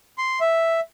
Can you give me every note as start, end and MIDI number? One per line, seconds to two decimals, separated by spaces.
0.18 0.39 84
0.40 0.80 76